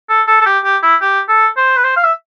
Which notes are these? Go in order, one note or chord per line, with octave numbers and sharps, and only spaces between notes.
A4
A4
A4
G4
G4
E4
G4
A4
C5
B4
C5
F5
E5